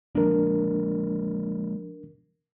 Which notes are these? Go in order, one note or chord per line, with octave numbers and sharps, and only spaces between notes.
F3 G#3 A#3 D4 A#4